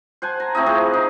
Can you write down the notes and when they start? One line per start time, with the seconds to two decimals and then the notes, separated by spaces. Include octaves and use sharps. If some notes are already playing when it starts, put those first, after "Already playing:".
0.22 C5 F#5 G#5 A5
0.40 A#5
0.55 A3 C4 E4 D#5
0.67 F3 G#4 F#5
0.93 D#4